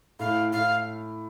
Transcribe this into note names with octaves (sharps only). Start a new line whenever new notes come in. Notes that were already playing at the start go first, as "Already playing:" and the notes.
A2 F5
A2 F5